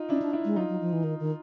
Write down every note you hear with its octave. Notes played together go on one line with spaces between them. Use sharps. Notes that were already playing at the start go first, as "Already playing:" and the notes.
Already playing: D#4 F4
C#4 D4 E4
D4
D4 E4
G#3
F#3 D#4 F4
F#3
F3
E3
D#3
D#3